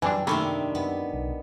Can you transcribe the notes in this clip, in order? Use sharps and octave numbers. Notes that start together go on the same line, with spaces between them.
F#2 E3 G3 C4 D4 G#5
C3 D#3 A3 A#3 D4 B5
F#2 B3
B1